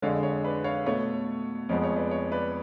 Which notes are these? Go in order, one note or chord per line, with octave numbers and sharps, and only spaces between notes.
F2 D3 G#3 C#5 F5
C#5
B4 D5
C#5 F5
B2 A3 C#5
F2 F3 G#3 B3 C#5
C#5
B4 D5
C#5
B4 D5